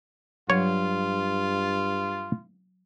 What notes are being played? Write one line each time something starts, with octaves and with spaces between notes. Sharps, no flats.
G2 F#3 F4 C#5